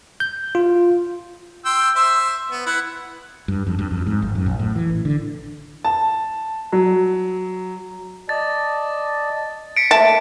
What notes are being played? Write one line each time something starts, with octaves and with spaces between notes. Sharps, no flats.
G6
F4
G5 C6 E6
C5 E5 E6
B3
E4 B4 F#5
G2
F2
G2
F2
G#2
G#1
F#2
A#1
A2
E3
A1
D3
A5
F#3
D5 D#5 A5 A6
B6 C#7 D7
A3 A#3 E5 A5